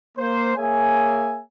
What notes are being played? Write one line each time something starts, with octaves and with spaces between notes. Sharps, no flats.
A#3 C5
A#3 G#4 C#5 E5 G#5